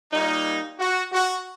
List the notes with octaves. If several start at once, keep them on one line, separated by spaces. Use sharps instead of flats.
A#2 G3 A#3 D#4
F#4
F#4